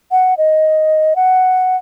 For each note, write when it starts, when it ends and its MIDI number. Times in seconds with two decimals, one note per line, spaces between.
0.11 0.34 78
0.38 1.14 75
1.16 1.77 78